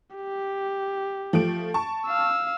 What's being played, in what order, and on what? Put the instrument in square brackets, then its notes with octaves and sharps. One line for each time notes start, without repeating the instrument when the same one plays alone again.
[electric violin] G4
[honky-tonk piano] F3 A3 D7
A5 C#6
[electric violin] F5 E6